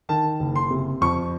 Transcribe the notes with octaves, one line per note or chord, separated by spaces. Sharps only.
D#3 A5
F#1
C6
C3
F2 C#6